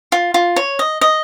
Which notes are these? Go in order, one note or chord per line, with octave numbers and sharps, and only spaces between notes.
F4
F4
C#5
D#5
D#5